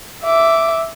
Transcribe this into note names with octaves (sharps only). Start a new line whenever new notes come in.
E5 D6